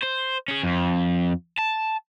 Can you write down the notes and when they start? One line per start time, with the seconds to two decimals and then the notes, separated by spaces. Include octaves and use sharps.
0.02 C5
0.48 C#4 G#4
0.63 F2
1.58 A5